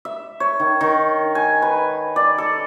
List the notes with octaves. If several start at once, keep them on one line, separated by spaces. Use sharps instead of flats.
E5
C#5
D#3
D#3
G#5
B4
D5
A4